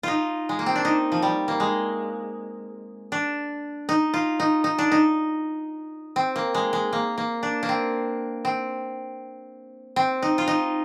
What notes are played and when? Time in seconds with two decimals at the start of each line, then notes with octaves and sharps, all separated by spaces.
0.03 D#4 F4
0.49 G#3
0.59 A#3
0.66 C4
0.75 D4
0.85 D#4
1.12 F3
1.22 G3
1.48 A#3
1.60 G#3
3.12 D4
3.89 D#4
4.14 F4
4.40 D#4
4.64 D#4
4.79 D4
4.92 D#4
6.16 C4
6.36 A#3
6.55 G#3
6.73 G#3
6.93 A#3
7.18 A#3
7.43 D4
7.63 A#3
7.69 C4
8.45 C4
9.96 C4
10.23 D#4
10.38 F4
10.48 D#4